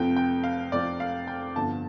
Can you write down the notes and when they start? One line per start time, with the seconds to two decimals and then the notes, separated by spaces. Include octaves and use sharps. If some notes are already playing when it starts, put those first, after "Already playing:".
Already playing: F1 F2 F3 C4 G5
0.16 G5
0.44 F5
0.72 F1 F2 F3 C4 D5
1.00 F5
1.27 G5
1.55 G1 G2 D3 F3 A5